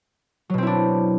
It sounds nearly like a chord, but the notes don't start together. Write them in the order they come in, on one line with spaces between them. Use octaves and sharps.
F#3 B2 C4 E4 D4